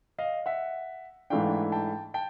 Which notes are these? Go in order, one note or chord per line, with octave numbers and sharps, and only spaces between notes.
D#5 F5
E5 F#5
G#2 E3 A3 D4 F5 G5
G5 A5
G5 A5